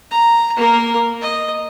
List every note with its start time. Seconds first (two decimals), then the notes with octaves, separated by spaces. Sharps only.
0.11 A#5
0.56 A#3 A#4
1.21 D#5